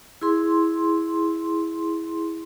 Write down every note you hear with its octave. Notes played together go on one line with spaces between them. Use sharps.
E4 G#4 C6